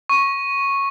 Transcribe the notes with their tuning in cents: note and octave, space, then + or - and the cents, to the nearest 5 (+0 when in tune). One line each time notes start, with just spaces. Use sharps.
C#6 -10